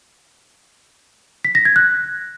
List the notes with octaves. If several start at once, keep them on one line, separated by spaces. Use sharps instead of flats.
B6
A#6
G#6
F#6